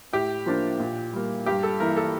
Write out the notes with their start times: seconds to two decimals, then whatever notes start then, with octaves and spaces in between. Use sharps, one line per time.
0.13 A2 G4
0.46 F3 A#3 D4
0.79 A#2
1.13 G3 A#3
1.46 G2 G4
1.63 A4
1.80 E3 A#3 E4 A#4
1.97 A4